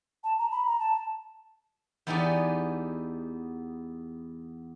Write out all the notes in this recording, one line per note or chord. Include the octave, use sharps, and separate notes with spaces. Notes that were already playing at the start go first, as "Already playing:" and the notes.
A5
A#5
B5
A#5
A5
E2 B3 D#4 G4 D5 G#5